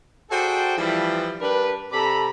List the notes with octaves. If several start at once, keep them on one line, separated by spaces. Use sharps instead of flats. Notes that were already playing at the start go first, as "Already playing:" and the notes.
F#4 G#4 A4 C5 D5 G5
E3 F3 G3
G3 D4 A#4 B4
C3 A4 D5 A#5 B5